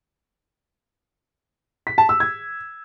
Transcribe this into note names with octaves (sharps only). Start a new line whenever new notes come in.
B6
A5
E6
G#6